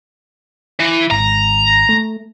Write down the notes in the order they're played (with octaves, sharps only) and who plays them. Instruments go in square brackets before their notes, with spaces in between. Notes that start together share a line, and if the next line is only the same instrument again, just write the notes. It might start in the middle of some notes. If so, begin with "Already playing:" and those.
[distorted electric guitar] E3
[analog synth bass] G#1 [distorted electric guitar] A#5
[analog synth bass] A3